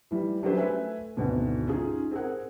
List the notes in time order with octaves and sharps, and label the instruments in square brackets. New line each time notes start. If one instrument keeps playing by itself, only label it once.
[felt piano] E3 G3
F#3 C#4 D4 G4 B4 C5
A3 B4 E5 G#5
G#1 D2 B2 D3
C#4 D#4 F4 G#4
C4 G#4 A#4 F#5